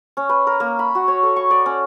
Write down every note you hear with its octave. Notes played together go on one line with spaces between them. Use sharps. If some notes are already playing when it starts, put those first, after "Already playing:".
C#4
B4
A#4
A#3
B5
F#4
C#5
A4
C#6
D5
C#4